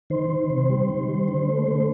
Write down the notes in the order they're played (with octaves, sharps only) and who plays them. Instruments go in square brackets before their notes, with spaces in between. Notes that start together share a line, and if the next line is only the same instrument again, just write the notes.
[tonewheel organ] D#3 C5
D#3
C3
G3
D#3
G3
D3
A3
A3